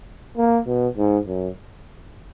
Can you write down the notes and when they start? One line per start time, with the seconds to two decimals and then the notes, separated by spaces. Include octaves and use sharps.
0.37 A#3
0.67 B2
0.97 G#2
1.28 F#2